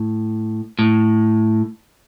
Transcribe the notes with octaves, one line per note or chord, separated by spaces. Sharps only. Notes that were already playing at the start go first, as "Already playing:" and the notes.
Already playing: A2
A2